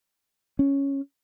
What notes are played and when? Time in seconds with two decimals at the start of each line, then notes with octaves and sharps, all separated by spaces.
0.59 C#4